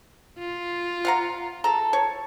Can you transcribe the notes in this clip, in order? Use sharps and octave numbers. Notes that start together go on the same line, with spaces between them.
F4
F5 F#5 A#5
A4 A#5
C#5